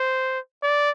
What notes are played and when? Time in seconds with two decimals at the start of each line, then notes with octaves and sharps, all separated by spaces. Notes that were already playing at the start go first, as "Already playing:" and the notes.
Already playing: C5
0.63 D5